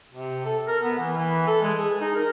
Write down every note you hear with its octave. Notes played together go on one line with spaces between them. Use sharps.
C3
A4
A#4
B3
E3
E3
A4
G#3
G#4
D#4
A#4